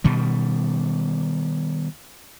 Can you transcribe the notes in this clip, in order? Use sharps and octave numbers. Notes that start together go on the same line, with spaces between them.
B2 D#3 G3